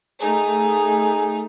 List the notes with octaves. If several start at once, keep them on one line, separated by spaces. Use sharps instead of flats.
A3 D#4 G#4